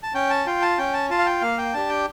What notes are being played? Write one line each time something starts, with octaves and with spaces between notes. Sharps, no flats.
A5
C#4 G5
A5
F4 G5
A5
C#4 G5
A5
F4 A5
F5
G5
A#3 F5
G5
D4 G4 A5
G5